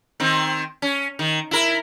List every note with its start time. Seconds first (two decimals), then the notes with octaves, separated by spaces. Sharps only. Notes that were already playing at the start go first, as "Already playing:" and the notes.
0.20 D#3 C4
0.82 C#4
1.19 D#3
1.51 E4 A#4